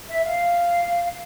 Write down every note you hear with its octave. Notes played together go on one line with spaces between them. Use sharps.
E5
F5